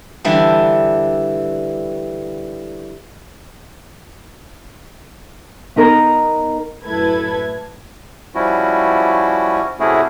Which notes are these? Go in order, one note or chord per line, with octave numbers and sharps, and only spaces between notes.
D3 E3 G3 D4
B3 D#4 A#4 A#5
F#2 A2 E4 A4 B4 G#6
F3 G3 C#4 E4 F#4
C3 A3 C#4 E4 F#4 G#4